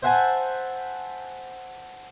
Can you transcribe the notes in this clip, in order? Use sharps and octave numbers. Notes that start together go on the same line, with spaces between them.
C5 E5 F#5 G#5 A5 B5